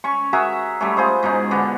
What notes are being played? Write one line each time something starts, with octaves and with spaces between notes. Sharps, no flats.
C#4 C#6
F#4 G#4 A#4 E5
G3 A3 C#4
F4 G#4 C5 D#5
G#2 B2 C#4 D#4
D3 B3 D5